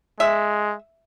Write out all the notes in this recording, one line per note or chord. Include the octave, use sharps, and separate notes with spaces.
G#3 E5